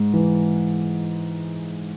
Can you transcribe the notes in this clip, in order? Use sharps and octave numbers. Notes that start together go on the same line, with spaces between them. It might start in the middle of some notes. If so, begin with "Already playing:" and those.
Already playing: G#2 G#3
E3